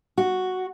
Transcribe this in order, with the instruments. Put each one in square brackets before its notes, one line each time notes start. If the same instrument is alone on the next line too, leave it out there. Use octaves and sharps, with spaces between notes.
[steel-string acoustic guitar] F#4